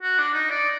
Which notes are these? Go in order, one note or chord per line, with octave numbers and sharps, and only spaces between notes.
F#4
D4
D#4
D5